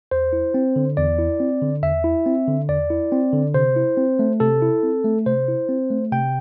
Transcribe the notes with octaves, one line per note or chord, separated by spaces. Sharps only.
E2 C5
E4
C4
D3
E2 D5
E4
C4
D3
E2 E5
E4
C4
D3
E2 D5
E4
C4
D3
C3 C5
E4
C4
A3
C3 A4
E4
C4
A3
C3 C5
E4
C4
A3
C3 G5